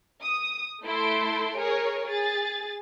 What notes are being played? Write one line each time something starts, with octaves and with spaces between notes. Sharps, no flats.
D#6
A3 E4 A4 C6 D7
G#4 A#4 C#5
G#4 A6